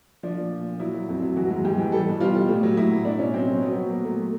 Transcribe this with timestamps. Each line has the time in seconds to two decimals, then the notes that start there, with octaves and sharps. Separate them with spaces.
0.23 F3 D4
0.38 A#2
0.52 A#2
0.66 A#2
0.80 F#3 E4
0.94 F#3
1.09 F2
1.23 F#3
1.37 E3 F#4
1.50 G#2
1.65 G#2 G4
1.78 E3
1.92 G3 A4
2.07 B2
2.20 G3 F4
2.35 G3
2.49 A2
2.63 F#3
2.77 A2 E4
2.91 A2
3.05 B2 D4
3.19 B2 C#4
3.34 F#3 C4
3.48 F#3
3.61 F#3 B3
3.76 F#3
3.90 A#2 A#3
4.04 F#3 A3
4.19 A3